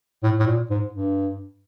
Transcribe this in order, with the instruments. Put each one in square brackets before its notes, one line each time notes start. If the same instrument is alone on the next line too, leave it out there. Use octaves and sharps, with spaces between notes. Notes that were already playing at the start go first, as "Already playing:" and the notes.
[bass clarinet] A2
A2
A#2
G#2
G2